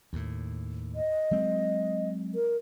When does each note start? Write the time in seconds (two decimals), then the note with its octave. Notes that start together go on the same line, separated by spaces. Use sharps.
0.13 D#2 A2
0.95 D#5
1.31 F#3 G#3 C4
2.35 A#4